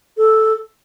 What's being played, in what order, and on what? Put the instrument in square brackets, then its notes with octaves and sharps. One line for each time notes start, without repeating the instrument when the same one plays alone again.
[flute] A4